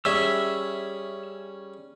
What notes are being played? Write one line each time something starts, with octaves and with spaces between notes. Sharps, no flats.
G3 C#4 G#4 E5 E6